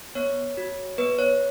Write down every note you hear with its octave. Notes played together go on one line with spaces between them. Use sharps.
B3 C#5
F#4
B3 B4
C#5